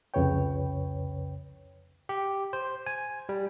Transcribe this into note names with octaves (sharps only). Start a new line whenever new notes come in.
C2 F2 C#3 B4 C#5 G5
G4
C5
G#5
G3